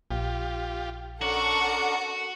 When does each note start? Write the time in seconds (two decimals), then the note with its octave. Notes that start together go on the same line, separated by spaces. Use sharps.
0.11 A#1 F4 G4
1.21 C#4 D4 F#4 A4 A#4 F#5 C#6